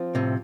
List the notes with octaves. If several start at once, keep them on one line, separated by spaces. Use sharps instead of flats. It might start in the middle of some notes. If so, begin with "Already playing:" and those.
Already playing: F3 C4 F4
A2 C3